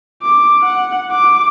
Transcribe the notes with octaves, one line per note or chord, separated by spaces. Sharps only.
D6
F#5
D6